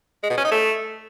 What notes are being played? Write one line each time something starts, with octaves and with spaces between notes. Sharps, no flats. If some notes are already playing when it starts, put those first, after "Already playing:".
G#3
B2
C#4
D#4
A3